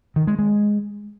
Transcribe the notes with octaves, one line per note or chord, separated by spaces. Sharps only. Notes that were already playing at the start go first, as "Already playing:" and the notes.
D#3
G#3
G#3